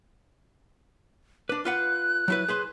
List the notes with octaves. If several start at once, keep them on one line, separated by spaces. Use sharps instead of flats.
D4 B4 D6
F4 B4 F#5 F#6
F#3 E4 B4
G#4 B4 C5